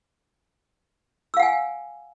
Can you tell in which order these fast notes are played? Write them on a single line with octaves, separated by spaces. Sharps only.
E6 F5 F#5 G#5